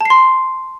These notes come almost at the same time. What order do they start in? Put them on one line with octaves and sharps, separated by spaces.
A5 C7 C6